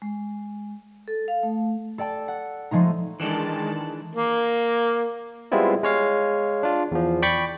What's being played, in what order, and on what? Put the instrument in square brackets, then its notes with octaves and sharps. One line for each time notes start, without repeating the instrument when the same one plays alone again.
[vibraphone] G#3
A4
F5
A3
[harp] A4 D5 G5 A5
F#5
F3 G#3 A3 D#4
[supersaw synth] D#3 G#3 A5 [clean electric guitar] E3 D4 A4
[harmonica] A#3
[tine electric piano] G3 G#3 B3 C4 E4 F4
G#3 C#5 F5
D4 F4
E2 F3
D5 G5 B5 C#6 D6